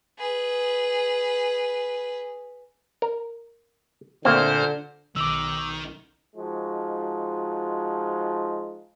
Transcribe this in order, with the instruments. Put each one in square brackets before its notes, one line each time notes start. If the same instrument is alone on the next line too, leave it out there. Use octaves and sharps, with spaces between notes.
[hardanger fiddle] G#4 B4
[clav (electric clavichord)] A#4
[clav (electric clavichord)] D2 A#3 C4 [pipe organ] A#2 C5 F6 [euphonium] D3
[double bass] B1 [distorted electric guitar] D#3 [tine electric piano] D6 E6
[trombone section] F3 G#3 D#4 F4 F#4